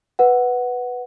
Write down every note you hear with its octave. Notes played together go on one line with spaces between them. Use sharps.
B4 F#5